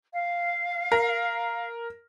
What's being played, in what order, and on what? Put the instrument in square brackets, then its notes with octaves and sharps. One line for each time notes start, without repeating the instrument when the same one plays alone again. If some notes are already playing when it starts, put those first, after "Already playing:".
[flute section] F5
[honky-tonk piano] A#4